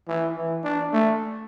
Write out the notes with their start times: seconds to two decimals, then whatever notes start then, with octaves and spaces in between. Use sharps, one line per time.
0.08 E3
0.36 E3
0.64 D4
0.92 A3